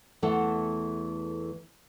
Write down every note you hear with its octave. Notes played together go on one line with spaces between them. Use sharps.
E2 E3 A3 A4 F#5 A5